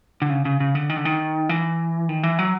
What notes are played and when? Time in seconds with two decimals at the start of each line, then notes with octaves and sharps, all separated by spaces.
0.22 D3
0.30 C#3
0.45 C#3
0.60 C#3
0.75 D3
0.90 D#3
0.97 D3
1.05 D#3
1.49 E3
2.09 D#3
2.23 E3
2.39 F#3